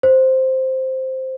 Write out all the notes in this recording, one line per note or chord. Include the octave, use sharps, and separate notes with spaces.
C5